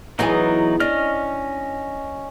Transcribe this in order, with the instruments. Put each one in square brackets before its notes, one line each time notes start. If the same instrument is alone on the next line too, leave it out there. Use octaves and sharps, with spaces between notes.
[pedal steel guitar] E3 F#3 D#4 [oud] B3 E4 G#4
[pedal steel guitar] C#4 D#5 F6 [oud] D4